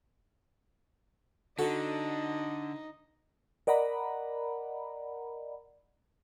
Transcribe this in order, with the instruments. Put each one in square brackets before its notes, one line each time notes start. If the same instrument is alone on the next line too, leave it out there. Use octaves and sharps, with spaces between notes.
[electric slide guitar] D3 [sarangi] D#4 [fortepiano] F#4 [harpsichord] A4
[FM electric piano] A#4 D5 D#5 F#5 A#5 B5